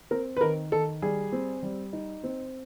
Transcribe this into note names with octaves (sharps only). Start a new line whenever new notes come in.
C4 A#4
B4
D#3 A#4
D#3 A4
G3 G#4
C4
G3
D#4
C4